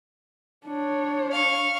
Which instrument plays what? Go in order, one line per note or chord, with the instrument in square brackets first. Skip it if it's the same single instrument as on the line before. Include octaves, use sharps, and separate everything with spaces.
[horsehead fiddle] D4 C#5
[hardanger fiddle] F5 C#6